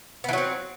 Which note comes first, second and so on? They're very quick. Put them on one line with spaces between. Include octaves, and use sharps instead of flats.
B3 E3 F#3 C4